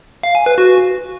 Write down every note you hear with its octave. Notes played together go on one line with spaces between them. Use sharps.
F5
G#5
B4
F#4